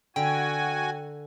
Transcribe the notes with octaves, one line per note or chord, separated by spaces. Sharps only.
D3 F#4 G5 G#5